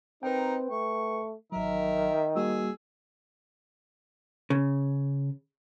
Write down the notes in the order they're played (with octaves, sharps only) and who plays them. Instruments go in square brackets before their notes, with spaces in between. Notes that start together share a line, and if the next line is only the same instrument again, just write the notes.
[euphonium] C4 [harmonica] D#4 A#4 [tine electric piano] B4 G5
[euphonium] A3 [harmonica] C#6
[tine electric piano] A1 F#3 [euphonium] D#3 [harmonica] A#4 E5
[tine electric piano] G3 A#3 F#4 [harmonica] G#4 E6
[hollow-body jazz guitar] C#3